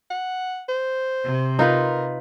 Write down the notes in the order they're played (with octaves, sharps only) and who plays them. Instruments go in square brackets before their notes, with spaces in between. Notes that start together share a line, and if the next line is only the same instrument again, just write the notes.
[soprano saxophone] F#5
C5
[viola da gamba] C3
[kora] D#4 F4 B4 [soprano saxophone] A#4